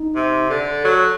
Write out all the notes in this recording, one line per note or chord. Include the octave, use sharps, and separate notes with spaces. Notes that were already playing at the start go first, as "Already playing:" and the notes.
Already playing: D#4
C3
D3
F#3 A4